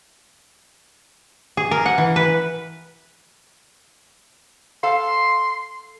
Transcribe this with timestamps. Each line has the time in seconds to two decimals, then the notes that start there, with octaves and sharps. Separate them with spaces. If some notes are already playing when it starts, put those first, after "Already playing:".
1.57 G#4
1.71 A#4
1.86 F#5
1.98 E3
2.16 B4
4.83 A4 F5 C6